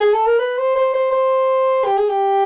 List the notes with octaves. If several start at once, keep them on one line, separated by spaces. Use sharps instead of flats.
G#4
A4
A#4
B4
C5
C5
C5
C5
G4
G#4
G4